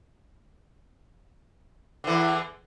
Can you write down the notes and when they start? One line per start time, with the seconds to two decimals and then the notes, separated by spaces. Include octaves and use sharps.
2.04 D3
2.07 E3
2.10 E2